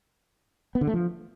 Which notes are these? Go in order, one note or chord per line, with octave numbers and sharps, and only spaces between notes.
B3
D3
A3
F3